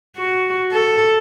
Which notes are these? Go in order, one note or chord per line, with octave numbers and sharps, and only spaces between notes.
F#4
A4